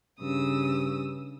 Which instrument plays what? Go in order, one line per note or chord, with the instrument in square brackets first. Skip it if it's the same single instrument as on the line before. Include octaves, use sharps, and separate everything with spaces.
[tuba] G2 [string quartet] C#3 D#6 E6